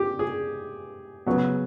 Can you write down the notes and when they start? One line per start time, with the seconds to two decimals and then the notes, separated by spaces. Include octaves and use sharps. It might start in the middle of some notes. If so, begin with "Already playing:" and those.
Already playing: G4
0.19 G#4
1.27 C#3 F#3 B3